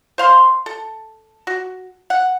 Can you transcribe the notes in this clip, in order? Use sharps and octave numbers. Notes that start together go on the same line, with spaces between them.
C5 F5 C6
A4
F#4
F#5